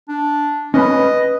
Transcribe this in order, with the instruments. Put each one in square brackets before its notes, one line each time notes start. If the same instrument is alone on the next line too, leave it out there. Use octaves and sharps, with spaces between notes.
[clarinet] D4
[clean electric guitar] C#4 B4 B5 [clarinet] D#5
[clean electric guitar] B4